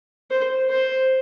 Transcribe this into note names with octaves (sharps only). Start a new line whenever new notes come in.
C5
C5